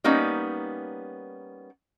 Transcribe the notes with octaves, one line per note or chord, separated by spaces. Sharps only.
G3 A#3 B3 C#4 D#4